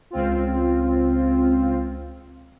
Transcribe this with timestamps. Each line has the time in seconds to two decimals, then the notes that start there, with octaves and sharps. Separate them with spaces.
0.10 C#2 C4 F4